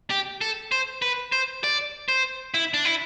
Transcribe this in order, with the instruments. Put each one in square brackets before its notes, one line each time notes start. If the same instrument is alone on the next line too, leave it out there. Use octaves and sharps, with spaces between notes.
[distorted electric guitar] G4
A4
C5
B4
C5
D5
C5
E4
D4
E4